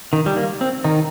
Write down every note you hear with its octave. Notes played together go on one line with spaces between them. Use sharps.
D#3
G3
A#3
C4
D#3 D#4